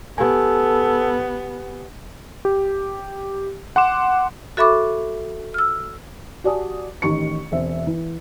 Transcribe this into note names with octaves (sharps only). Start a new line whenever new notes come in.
B3 G4 A4 G#5
G4
F#5 C6 D6 E7
F#4 A4 E5 B5 C#6 D6
E6 F6
F#4 G4 D5 G#5 A5 D#6
A1 D#3 G4 C#6 C#7
E1 C4 E5
E3